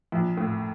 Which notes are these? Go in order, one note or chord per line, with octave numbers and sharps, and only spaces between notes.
A#1
A2